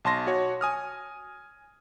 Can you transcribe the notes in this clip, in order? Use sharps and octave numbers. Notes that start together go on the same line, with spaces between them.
B1 A5 C6 A#6
F#4 C#5
G#5 D#6 F6